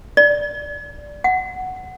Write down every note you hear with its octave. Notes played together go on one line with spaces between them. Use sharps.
D5
F#5